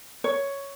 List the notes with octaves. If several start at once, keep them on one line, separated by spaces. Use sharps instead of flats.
C#5